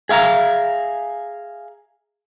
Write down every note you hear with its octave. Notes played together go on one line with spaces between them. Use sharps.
G#4 E5 F5 A5 A#5